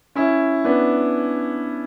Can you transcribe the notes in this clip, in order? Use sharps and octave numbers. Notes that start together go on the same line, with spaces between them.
C#4 E4
B3 D4